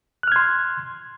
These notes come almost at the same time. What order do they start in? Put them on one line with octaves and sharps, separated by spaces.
F#6 F6 G#6 C6